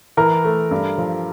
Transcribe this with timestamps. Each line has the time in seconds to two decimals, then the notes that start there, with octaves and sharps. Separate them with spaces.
0.17 E3 A#4
0.44 A3
0.71 G2
0.98 F3